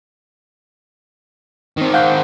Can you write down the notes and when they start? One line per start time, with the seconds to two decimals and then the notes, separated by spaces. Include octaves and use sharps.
1.77 D#3 C4
1.94 F5 F#5 G6